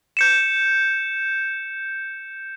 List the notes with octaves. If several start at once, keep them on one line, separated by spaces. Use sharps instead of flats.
G6 C#7 E7